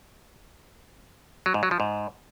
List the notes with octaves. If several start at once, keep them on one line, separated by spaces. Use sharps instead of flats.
F#3
G#2
F#3
F3
G#2